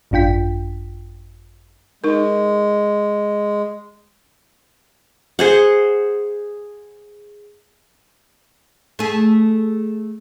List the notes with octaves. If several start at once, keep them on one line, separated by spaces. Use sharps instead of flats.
G#1 F#2 D4 F4 G5 B6
G#3 D#4 A#4
G#4 C5 F#5
A3 G#4